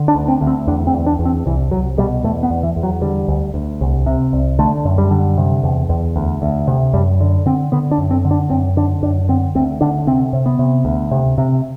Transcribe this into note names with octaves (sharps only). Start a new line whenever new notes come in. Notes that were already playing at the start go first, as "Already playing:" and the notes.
Already playing: D3
D4
D2
C4
D2
C4
E2 D4
C4
E2
D4
E2
C4
C2 E3
C2 F#3
B2 G3
E2 A3
B3
E2
E3
E2
F#3
D3 G3
D2
D2
C2
C3
C2
D3 A3
F#2
G3
D3
C3
E2
E2
D2
D2
C3
F#2 G3
D3
D3 C4
D3 B3
D4
F#2
C4
D3
D4
F#2 C4
D3 D4
F#2 D4
D3 C4
D2 C4
D3 D4
C3 C4
C3
B3
C3
D2
C3
C3